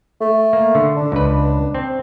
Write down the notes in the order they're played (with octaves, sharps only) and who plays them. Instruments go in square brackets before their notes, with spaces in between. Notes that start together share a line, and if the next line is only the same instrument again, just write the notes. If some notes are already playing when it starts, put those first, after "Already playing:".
[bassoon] A3
[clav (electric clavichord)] A#3
D3
[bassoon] D4
[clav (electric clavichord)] C#2 B4
C4